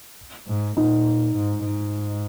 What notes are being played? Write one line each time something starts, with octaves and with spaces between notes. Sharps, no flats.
G#2
A#2 D#4
G#2
G#2